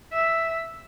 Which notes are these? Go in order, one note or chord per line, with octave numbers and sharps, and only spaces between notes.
E5